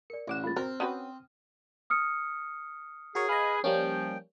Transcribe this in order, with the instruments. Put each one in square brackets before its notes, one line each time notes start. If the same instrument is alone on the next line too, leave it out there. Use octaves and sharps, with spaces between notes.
[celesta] A#4 D5 [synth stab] C#7
[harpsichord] A1 [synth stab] C#5 D6 E7 [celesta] D5 F#5 F#6
[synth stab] G#3 A#3 F4 [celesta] B5 A6
[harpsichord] C4 [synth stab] F#4 [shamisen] A#4 [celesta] F6
[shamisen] C#4 F#4 B4 [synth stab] G5 D#6
[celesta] D#6 F6 C#7
[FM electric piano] F#4 A#4 C#5 [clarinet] G#4
[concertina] B4 G#5 F#6 [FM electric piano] D#5 F5
[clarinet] F3 [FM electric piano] G3 A#3 C#4 [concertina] G5